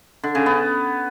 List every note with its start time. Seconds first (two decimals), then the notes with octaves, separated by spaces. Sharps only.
0.24 D3
0.35 C#3
0.46 B3